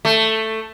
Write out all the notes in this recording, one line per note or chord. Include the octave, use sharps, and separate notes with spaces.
A3